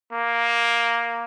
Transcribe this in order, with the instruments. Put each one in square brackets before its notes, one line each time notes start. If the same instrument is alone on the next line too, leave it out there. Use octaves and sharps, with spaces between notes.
[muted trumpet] A#3